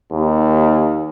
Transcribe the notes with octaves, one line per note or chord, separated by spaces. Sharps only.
D#2